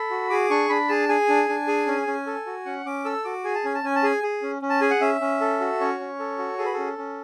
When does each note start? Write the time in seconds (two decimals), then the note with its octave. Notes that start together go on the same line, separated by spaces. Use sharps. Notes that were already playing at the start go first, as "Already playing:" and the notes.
Already playing: A4 B5
0.10 F#4
0.30 G#4 D6
0.50 D4 C#6
0.69 D4 B5
0.89 G#4 A5
1.09 G#4 G#5
1.29 D4
1.49 D4
1.68 G#4
1.87 C#4
2.07 C#4
2.27 A4
2.46 F#4
2.65 C#4 F#5
2.85 C#4 D6
3.05 A4 E6
3.25 F#4 D6
3.44 G#4 G#5
3.55 A5
3.64 C#4 G#5
3.75 A5
3.83 C#4 G#5
3.96 A5
4.03 G#4 G#5
4.23 G#4
4.42 C#4
4.62 C#4
4.70 A5
4.81 G#4 G#5
4.91 F#5
5.01 C#4 E5
5.21 C#4
5.41 A4
5.60 F#4
5.80 C#4 C#5
6.00 C#4
6.19 A4
6.38 F#4
6.58 G#4 A4
6.65 B4
6.74 C#4 A4
6.98 C#4